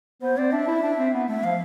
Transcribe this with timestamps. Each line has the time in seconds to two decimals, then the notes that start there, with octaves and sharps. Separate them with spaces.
0.22 B3 C5
0.37 C4 D5
0.52 D4 E5
0.67 E4
0.83 D4
0.98 C4
1.14 B3
1.29 A3 E5
1.44 F3 F5